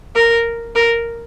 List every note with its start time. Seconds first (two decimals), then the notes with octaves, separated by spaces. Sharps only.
0.15 A#4
0.76 A#4